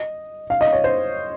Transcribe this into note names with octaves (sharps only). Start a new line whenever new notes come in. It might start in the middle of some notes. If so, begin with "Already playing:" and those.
Already playing: D#5
F5
D#5
C#5
C5